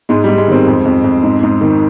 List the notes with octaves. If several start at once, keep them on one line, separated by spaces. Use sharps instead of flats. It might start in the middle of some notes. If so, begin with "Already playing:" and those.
G#2 G#3
G#2 G3
G#3
D#3 G#3 C4
F2
F2
F2
G#2
G#2
D#3